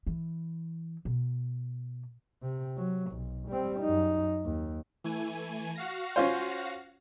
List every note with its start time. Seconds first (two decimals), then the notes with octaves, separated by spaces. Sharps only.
0.07 E3
1.05 B2
2.43 C3
2.77 F#3
3.12 B1
3.49 G3 C4
3.80 F#2 D#4
4.45 D#2
5.04 E3 A3 G#5
5.75 F#4 F5 A#6
6.16 C#4 F4 C5